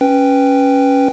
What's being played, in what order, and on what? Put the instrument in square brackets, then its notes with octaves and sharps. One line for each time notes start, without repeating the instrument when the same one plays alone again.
[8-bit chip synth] C#4 B4 G5